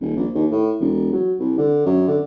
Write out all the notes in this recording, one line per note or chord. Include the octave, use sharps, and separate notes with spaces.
D#1
A#1
D#2
A2
E1
F#3
C2
D3
F#2
D3